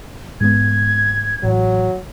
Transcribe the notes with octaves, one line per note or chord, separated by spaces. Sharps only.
G#2 G#3 B3 G#6
A1 F#3